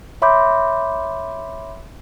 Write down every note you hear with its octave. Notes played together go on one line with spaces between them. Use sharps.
C#5 E5 B5 C6 D6 G6